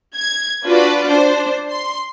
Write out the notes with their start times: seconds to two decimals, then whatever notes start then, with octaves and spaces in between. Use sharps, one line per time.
0.15 G#6
0.64 D4 F4 F#4 B4 D5
1.06 D4 C5
1.71 C6